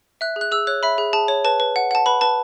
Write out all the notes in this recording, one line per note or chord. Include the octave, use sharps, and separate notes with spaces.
E5 F#6
G#4
F#6
G#4 E6
C#5 F#6
E5 B5
G#4
G#4 A5
C#5
B4 A5
B4
F#5
F#5 A5
B4 B5
B4 A5